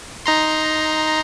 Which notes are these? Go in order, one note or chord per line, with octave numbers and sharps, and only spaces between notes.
D#4 A#5 C6